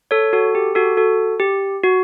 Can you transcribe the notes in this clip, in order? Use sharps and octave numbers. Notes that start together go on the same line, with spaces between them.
A4 C#5
F#4 A4
G4
F#4 A4
F#4 A4
G4
F#4